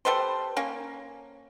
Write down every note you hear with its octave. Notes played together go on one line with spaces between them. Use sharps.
G3 A4 B4 C5
A#3 C#4